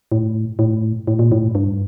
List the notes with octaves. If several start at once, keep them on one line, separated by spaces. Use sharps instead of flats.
A2
A2
A2
A#2
A2
G2